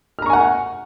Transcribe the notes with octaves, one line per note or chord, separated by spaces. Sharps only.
F#5 G#5 A#5 C#6 F6